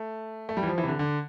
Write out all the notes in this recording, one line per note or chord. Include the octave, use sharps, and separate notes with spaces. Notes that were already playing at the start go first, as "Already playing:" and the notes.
Already playing: A3
A3
G3
E3
F3
E3
C3
D3
D3